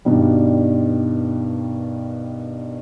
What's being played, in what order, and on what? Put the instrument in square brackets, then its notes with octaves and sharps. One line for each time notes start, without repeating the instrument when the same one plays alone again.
[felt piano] G2 B2 D#3 G3